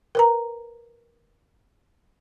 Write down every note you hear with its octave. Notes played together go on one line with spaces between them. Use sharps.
A#4 B4 A#5